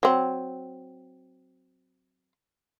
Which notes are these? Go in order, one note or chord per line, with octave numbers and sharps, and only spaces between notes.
F#3 C4